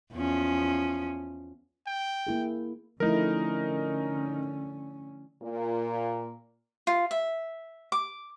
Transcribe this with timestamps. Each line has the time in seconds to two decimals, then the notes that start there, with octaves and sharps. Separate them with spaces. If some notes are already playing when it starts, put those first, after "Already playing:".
0.14 E2 F3 C#4
1.87 G5
2.27 A#3 E4 G#4
3.00 D3 F3 A3 C#4 D#4 E4 A#4
5.42 A#2 A#3
6.87 F4
7.11 E5
7.92 D6